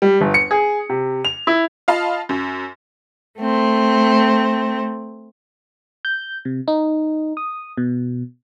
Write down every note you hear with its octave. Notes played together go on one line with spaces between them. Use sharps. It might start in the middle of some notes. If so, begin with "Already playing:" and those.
G3
G1
C#7
G#4
C3
F7
E4
F4 D#5 F5 A5 B5
F#2
A3 C4
G6
C3
D#4
D#6
B2